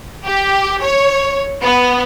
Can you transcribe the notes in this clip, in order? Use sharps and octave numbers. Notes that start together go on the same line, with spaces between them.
G4
C#5
B3